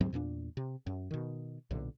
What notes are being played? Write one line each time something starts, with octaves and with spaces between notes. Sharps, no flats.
D2 G#2 F#3 C4
E2 A#2 C4 D4
C3
F#2
B2 D#3
B1 A#2 D3